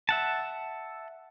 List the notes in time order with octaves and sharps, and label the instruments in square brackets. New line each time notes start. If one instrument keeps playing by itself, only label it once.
[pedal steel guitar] E5 F#5 A5